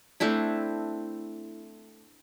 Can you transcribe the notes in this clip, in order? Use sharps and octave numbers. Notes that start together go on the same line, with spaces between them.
A3 C4 D4 E4